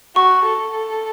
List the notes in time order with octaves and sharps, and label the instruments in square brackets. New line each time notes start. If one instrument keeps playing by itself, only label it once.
[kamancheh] F#4 [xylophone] C#6
[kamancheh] A4